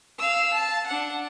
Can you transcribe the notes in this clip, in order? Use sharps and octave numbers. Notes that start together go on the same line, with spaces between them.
F5 E6
A5
D4 F#5